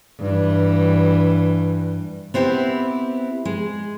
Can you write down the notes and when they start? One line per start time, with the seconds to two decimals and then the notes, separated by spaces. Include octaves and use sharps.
0.19 G2 E3
2.34 B3 C4 E4 G4
3.45 G#3